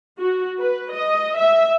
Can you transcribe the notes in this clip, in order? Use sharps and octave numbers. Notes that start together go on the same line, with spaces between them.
F#4
B4
D#5
E5